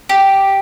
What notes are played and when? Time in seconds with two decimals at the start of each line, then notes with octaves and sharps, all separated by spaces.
0.09 G4